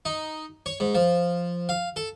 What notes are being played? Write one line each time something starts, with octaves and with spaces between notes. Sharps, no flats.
D#4
C#5
G#2
F3
F5
A4